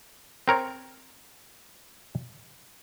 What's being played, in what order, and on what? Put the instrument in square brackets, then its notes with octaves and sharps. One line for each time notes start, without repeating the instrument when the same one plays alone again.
[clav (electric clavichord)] C4 A#4 C#5